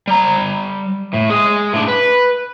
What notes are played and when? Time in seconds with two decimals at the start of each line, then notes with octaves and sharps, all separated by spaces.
0.07 G3 A#5
1.13 A2
1.29 G#3 G#4
1.73 A2 D4
1.88 B4